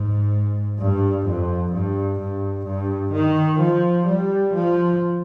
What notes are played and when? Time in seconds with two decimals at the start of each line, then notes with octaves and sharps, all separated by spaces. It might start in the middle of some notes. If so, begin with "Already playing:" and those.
Already playing: G#2
0.79 G2
1.26 F2
1.72 G2
2.19 G2
2.66 G2
3.13 D#3
3.60 F3
4.06 G3
4.54 F3